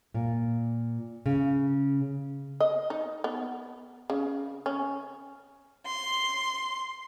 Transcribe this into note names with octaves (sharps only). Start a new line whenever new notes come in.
A#2
C#3
D#5
D#4
B3
C#3
C#4
C6